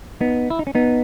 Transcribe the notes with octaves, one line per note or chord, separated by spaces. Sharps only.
B3 D#4
E4
D#4
C#4
B3 D#4